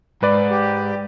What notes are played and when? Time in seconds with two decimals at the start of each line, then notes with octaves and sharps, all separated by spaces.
0.23 G#2 B4 D5
0.50 G4